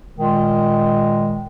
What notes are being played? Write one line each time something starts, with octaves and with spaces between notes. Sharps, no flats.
A#2 D#3 G#3